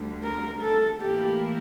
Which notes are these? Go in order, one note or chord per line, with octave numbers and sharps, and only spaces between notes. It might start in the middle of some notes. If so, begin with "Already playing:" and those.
Already playing: D2 D3 G3
A#4
A4
A2 E3 A#3 E4 G4 A#4